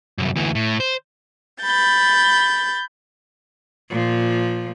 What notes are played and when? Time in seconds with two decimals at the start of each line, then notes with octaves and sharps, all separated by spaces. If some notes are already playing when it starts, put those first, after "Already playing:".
0.18 C2 F#2
0.36 D2 E3
0.55 A2
0.80 C5
1.62 B5 G6 A6
3.90 A#2 F3